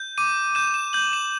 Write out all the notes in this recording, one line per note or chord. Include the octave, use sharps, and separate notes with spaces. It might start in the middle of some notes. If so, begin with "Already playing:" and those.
Already playing: G6
D6 D#7
G6 E7
E7
G6 F#7
E7